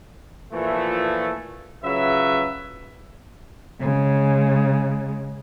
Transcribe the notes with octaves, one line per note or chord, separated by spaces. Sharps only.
A#2 E3 F3 A3
C#3 F#3 F4 B4 E5
C#3 G#3